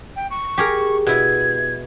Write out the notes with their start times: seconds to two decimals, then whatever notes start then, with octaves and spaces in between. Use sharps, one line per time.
0.16 G5
0.30 C#6
0.58 G4 G#4 A#4
1.07 B2 E4 G#6